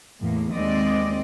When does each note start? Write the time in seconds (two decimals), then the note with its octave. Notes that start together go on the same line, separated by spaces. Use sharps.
0.20 E2 A2 A#3
0.53 D#2 D#3 G#3 C4 D5 D#5